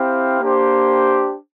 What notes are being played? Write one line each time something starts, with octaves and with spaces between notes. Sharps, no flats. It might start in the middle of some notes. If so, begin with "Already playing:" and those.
Already playing: C4 E4 G4 C5 F5
A#3 D4 G4 C5